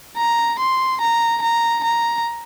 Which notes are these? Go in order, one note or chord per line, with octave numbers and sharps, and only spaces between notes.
A#5
C6
A#5
A#5
A#5